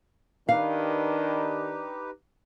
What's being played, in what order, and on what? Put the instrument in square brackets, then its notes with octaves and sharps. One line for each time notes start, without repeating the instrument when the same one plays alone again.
[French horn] D#3 [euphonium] D4 [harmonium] D#4 G4 B4 [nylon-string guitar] F5